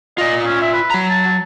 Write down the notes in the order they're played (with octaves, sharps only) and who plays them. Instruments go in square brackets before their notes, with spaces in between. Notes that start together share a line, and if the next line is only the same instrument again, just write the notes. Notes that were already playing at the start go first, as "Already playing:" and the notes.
[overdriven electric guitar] F4 D5 [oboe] D#5
[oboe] C#4
E5
B4
[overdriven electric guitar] F#3 A#5
[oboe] A5